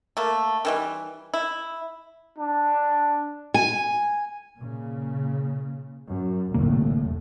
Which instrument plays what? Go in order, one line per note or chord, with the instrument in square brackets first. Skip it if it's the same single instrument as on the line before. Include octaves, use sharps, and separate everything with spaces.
[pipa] A3 A#3
D#3 E3 G3
E4
[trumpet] D4
[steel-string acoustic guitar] G#5
[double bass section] A#2 C#3
F#2
[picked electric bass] E1 D3 A#3 [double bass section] C2 A2